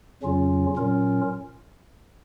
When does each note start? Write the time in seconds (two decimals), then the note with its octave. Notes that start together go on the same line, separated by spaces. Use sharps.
0.23 F2 C#3 F#3 C#4 F4
0.76 A#2 F#3 C#4 F4 A#4